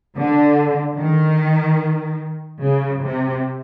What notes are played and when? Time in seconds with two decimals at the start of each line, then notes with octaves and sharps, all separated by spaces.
0.16 D3
0.98 D#3
2.62 C#3
3.03 C3